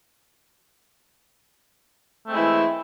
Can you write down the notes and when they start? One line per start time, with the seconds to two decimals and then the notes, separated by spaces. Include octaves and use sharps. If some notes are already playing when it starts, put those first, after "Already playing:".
2.27 A3
2.29 C4
2.32 G#3
2.34 E4
2.37 E3